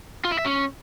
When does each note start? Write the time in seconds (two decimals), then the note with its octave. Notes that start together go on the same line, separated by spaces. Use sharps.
0.25 F4
0.32 E4
0.39 E5
0.46 C#4